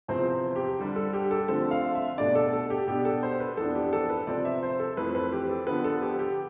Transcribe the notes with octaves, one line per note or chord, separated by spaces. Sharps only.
E2 C3 F3 C4 C5
G4
D3 G3 D4
A4
G4
A4
D3 F3 A3 C4 A4
F5
E5
B2 A3 D4 D5
A4
A4
G4
B2 B3 D4 G4
A4
C5
B4
F2 E3 B3 D4 A4
G4
A4
B4
C3 F3 C4 D5
E5
C5
A4
F2 E3 A3 C4 B4
B4
G4
A4
D3 F3 B3 B4
A4
G4
G4